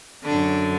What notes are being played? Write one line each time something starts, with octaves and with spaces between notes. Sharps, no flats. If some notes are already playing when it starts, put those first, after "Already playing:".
F#2 D3 D4